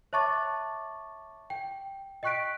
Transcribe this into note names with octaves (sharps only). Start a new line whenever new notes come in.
C#5 E5 A5 C#6 D6 A6
G5
D#5 G5 C#6 F#6 B6 D7